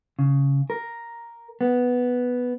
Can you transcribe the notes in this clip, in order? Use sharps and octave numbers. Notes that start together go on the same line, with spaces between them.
C#3
A#4
B3